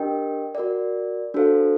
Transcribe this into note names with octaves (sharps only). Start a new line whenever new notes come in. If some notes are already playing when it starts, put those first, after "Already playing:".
Already playing: D4 G4 A#4 D#5 G5
F#4 A#4 D5
D4 F#4 A4 C5 F5